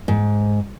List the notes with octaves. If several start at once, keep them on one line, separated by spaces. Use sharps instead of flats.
G#2